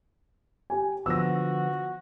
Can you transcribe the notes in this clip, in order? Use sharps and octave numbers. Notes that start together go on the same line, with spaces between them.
G4 G#5
D3 F3 B3 F#4 E6 A#6